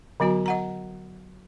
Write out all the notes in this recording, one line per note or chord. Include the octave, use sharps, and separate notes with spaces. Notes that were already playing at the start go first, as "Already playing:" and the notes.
D3 F#3 B3 F#4 A#5
D#5 F#5 A#5